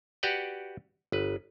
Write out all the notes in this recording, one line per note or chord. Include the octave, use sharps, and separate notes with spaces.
F#4 G4 B4 D5 F#5 G5
G1 B4